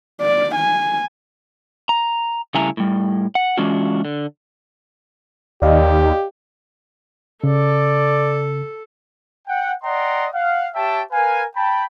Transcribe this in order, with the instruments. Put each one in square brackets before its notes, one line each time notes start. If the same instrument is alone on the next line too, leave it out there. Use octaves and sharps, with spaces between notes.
[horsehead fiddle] D5
G#5
[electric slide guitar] A#5
C#3 G3 A3 E4 G#5 A#5
A2 G3
F#5
E3 G#3 C#4 D4 F4 F#4
D3
[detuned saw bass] D#2 [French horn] G4 [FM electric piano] D5 D#5 F5
[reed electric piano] C#3 [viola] A4 [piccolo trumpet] D5
[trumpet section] F#5 G5
D5 D#5 F#5 G5 A#5 C6
F5 F#5
G4 C#5 E5 G5 A5
A#4 B4 F5 G#5
G5 A5 B5